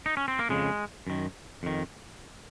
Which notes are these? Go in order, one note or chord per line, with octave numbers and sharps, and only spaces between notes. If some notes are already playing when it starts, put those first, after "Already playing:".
D#4
C#4
C4
A#3
F2 C#3 G#3
F#2 D#3
F2 D#3